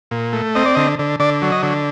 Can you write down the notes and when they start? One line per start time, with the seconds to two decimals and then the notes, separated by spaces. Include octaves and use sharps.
0.11 A#2
0.33 A3
0.55 C4 D#5
0.65 D5
0.75 D3 D#5
0.99 D3
1.20 D3 D5
1.42 F#3
1.52 D#5
1.63 D3